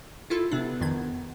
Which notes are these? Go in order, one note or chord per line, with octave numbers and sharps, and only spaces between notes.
E4 F4 A4
C3 B3 D4
F2 D#3 G#6